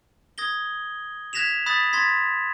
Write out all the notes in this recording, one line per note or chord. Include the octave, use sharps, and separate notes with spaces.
D#6 G#6 A#6 G7
F#6 G#6 A#6 B6 E7 F7
B5 D#6 F#6 A6 B6
C6 G#6 A6 B6